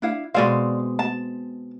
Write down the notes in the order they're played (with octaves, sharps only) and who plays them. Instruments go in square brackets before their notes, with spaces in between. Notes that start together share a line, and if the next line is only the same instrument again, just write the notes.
[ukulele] D4 E4 F5
[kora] B2 G#3 C4 [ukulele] D5 F5
[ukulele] A5